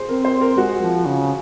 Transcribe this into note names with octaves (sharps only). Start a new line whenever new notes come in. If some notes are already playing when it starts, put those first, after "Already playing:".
Already playing: G#4 C5
C4 A#4
C5
A#4
G#3 F#4
F3
C#3